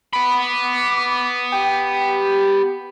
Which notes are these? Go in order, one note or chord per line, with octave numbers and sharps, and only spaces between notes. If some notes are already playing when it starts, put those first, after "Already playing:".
B3 B5 D6
G4